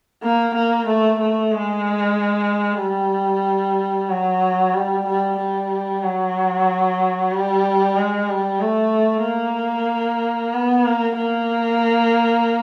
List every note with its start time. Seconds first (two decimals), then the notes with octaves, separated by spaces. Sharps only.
0.23 A#3
0.55 A#3
0.87 A3
1.19 A3
1.51 G#3
2.80 G3
4.09 F#3
4.73 G3
5.05 G3
5.38 G3
6.03 F#3
7.31 G3
7.96 G#3
8.28 G3
8.60 A3
9.24 A#3
10.53 B3
10.85 A#3
11.18 A#3